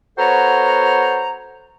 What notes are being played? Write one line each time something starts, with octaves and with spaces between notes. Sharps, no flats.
B3 F#4 A4 C5 C#5 A#5